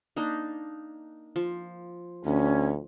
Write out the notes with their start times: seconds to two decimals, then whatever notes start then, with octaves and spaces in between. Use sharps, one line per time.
0.16 A#3 D4 D#4
1.36 F3
2.25 D2 C#4